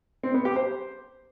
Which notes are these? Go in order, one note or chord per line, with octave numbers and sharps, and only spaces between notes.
C4
B3
G4
C5